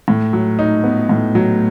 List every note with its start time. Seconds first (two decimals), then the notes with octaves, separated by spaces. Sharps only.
0.08 A2
0.33 F#3
0.59 D#4
0.84 B3
1.09 A2
1.35 F#3